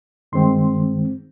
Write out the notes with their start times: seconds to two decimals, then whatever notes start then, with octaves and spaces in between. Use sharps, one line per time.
0.32 G2 D#3 G#3 C4 C6